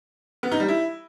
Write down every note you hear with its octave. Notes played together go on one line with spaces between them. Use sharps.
B3
D#4
G3
E4